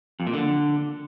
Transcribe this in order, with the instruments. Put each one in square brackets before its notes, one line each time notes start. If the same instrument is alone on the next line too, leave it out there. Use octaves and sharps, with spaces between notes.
[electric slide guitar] F2
A#2
D3